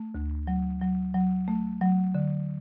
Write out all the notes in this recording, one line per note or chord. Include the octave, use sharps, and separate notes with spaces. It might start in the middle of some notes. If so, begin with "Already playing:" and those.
Already playing: A3
D2
F#3
F#3
F#3
A3
F#3
D3